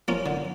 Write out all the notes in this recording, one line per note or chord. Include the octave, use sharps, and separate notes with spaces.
F3 A#3 C#4
D3